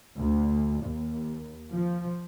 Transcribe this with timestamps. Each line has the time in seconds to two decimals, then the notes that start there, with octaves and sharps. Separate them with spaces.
0.17 D2
0.85 D#2
1.71 F3